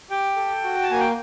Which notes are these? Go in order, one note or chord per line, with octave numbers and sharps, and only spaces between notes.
G4 G5
A4
F#4
A5
A#3 G#5
G5